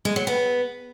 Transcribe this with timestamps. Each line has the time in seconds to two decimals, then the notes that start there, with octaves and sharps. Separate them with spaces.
0.05 G#3
0.16 F#3
0.27 B3